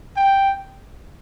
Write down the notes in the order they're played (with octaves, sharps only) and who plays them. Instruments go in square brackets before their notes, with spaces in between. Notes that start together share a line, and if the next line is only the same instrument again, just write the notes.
[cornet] G5